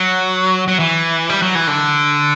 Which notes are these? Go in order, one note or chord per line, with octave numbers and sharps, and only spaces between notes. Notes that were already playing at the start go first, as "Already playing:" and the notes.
Already playing: F#3
F#3
E3
G3
F#3
E3
D3